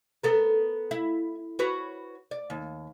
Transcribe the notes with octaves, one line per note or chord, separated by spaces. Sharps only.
B3 A4 A#4
E4
F#4 B4 C#5
D5
D#2